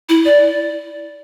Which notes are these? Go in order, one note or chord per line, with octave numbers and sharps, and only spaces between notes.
E4
D5